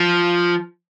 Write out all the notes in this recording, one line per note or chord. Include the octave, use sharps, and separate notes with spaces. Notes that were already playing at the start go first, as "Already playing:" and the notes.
Already playing: F3